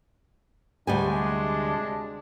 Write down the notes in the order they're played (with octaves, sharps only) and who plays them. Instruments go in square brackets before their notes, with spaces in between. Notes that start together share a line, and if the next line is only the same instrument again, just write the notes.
[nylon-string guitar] D2 G3 G#5 [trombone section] C3 G#3 D4